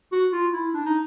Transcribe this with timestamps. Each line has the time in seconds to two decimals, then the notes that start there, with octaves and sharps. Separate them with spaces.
0.12 F#4
0.32 F4
0.53 E4
0.74 D4
0.86 D#4